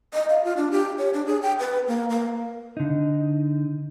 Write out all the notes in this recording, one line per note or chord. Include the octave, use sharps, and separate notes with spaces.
D#5
F5
F4
D4
G4
C#5
D4
G#4
G5
B4
A#3
A#3
D3 D#4